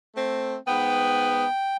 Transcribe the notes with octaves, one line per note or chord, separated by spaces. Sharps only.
A3 C4
G#2 B3 G5